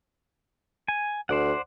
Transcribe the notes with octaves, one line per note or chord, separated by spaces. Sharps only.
G#5
D2 C5 D5 F#5